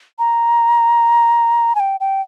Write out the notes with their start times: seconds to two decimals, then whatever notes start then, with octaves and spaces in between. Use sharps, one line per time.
0.19 A#5
1.75 G#5
1.80 G5
2.00 G5